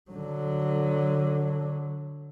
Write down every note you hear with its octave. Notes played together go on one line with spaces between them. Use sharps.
D3 F#3